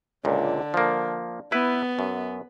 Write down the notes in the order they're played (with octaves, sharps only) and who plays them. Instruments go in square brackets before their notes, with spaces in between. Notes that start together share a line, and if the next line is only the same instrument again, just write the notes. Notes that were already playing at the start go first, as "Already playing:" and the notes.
[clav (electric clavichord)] C#2 A#2 [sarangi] D3
[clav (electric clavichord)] F3 A#3
[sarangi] B3 [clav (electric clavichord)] E4 B4
[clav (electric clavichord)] F#2